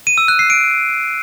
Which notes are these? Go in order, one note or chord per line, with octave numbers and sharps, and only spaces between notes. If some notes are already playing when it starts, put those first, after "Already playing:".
D#7
E6
F#6
C7
D7